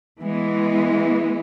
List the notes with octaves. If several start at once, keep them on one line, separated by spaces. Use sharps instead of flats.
E3 G#3 B3